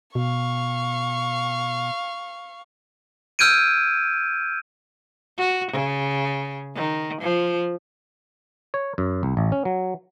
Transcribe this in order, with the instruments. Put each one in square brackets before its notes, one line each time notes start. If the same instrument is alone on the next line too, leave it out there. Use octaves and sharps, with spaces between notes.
[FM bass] B2 [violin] F5 C#6
[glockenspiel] E6 F6 G6 G#6 D7 D#7
[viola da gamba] F#4
C#3
D#3
F3
[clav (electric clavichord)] C#5
F#2
C2
A1
C#4
F#3